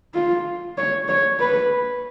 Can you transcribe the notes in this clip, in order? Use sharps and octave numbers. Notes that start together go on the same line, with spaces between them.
F4
C#5
C#5
B4